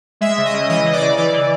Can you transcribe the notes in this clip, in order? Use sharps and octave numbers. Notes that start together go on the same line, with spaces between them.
G#3 E5
C#3
D#5
C#3
E3 D#5
E3
D5
C#3
E3 D5
E3